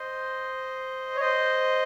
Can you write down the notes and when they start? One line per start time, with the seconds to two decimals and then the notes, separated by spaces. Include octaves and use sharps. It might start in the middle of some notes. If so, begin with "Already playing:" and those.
Already playing: C5 D#5
1.16 C#5
1.20 C5 D#5